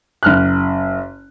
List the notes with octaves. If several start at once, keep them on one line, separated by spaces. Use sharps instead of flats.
F#1 F6 F#6